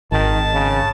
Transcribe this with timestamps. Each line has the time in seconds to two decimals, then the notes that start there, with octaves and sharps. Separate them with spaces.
0.12 G#1 D#3 A5
0.54 C#3